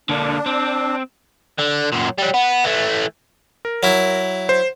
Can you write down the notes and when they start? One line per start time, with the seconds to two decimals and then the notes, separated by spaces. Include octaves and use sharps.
0.09 D3 A#3 D4
0.46 C4
1.58 D3
1.92 F#2 A#2
2.18 F#3 G3
2.34 B3
2.64 E3 A3
3.65 A#4
3.83 F#3 E4
4.49 C5